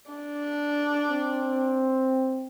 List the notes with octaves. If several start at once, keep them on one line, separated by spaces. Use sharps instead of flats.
D4
C4